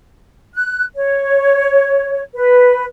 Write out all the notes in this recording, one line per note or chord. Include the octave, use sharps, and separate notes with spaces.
F#6
C#5
B4